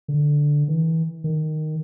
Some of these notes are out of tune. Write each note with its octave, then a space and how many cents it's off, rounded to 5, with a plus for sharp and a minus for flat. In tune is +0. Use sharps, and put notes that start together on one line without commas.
D3 +0
E3 -30
D#3 -5